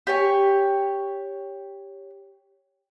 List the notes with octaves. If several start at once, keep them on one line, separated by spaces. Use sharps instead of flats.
G4 C#5 G#5